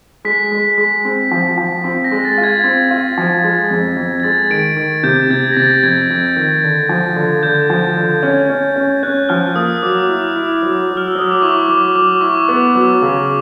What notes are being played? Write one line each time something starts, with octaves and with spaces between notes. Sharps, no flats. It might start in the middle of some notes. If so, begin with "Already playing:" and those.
G#3 B6
G#3
G#3
C4
F3
F3
C4
A#6
G#3
A6
F4
G#6
A6
C4 G#6
F4
F3
G#3
F2
F2
G#6
G#3 A6
D#3 D7
D#3
C3 G6
C3 G#6
A#6
C3 A6
F2 G#6
F2
D#3
D3
F3
D3
D3 G6
F3
D3
C#4
C#4
C#4
C#4 F#6
F3 F6
A#3 D#6
F#3 D6
E4
E4
F#3
F#3
F6
E6
F#3 D#6
D6
E4 C#6
F#3 D6
F#3 D6
E4 C#6
B3
F#3
C#3